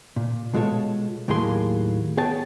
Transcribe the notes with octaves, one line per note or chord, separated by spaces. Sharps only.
A#2
B2 G#3 F4 A4 C#5
D#2 A2 F#3 A#3 G#4 C6
B3 G#4 C#5 G5 A5